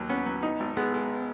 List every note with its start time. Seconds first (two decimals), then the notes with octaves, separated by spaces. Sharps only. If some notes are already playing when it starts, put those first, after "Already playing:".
Already playing: D#2 F#3
0.10 B3 C#4
0.26 F#3
0.43 D#4
0.60 G#1
0.77 G#3 B3
0.94 G#3